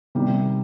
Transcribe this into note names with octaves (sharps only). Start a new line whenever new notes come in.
C3 D#3 G3